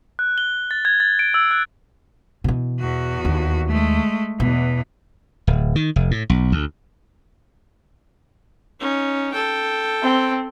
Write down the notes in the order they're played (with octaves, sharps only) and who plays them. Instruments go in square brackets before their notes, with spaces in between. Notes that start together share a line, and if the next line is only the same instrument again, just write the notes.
[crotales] F#6
G7
A6
G#6
A6
D7
E6
F#6
[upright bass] B2 E3
[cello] E2 F#4
[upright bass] D#2
[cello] G#3 A3
[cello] E2 E3 [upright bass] B2
[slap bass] D1
D#3
F1
A2
B1
D2
[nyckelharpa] C#4 D#4
A4 G5
[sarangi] C4